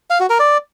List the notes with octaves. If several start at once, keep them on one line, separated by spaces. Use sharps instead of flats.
F5
F#4
A#4
D5